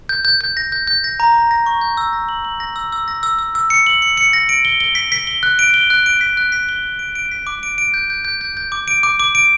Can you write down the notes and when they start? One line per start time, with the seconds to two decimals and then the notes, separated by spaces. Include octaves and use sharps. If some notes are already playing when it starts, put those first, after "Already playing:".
0.09 G6
0.25 G6
0.41 G6
0.57 A#6
0.72 G6
0.87 G6
1.04 A#6
1.20 A#5
1.34 A#5
1.51 A#6
1.66 C#6
1.81 G6
1.97 E6
2.13 A#6
2.29 F#7
2.45 F#7
2.60 A#6
2.76 E6
2.92 E6
3.08 A#6
3.23 E6
3.39 E6
3.55 E6
3.70 C#7
3.87 F#7
4.02 C#7
4.17 C#7
4.33 A#6
4.49 D7
4.65 G7
4.81 G7
4.95 B6
5.12 B6
5.27 G7
5.43 F#6
5.59 D7
5.74 G7
5.90 F#6
6.06 D7
6.21 B6
6.37 F#6
6.52 B6
6.69 G7
6.83 G7
6.99 D7
7.15 D7
7.31 B6
7.47 D6
7.63 D7
7.78 D7
7.94 G6
8.10 G6
8.25 G6
8.41 G6
8.57 G6
8.72 D6
8.88 D7
9.03 D6
9.20 D6
9.35 D7